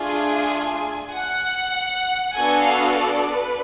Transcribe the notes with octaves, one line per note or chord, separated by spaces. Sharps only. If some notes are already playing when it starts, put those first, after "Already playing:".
Already playing: A3 D4 F4 G#4 G#5
F#5
B3 D4 F#4 A4 G#5
F5
D5
B4